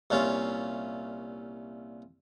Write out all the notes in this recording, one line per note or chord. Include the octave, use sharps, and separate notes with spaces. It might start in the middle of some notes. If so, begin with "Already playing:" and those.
C2 A#2 C#4 F4